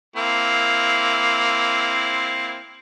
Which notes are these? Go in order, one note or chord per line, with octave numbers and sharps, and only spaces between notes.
A#3 C4 E4